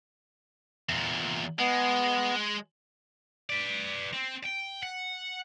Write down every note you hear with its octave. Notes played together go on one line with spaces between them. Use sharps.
E2 A#2
G#3 B3
B4 D5
C4
G5
F#5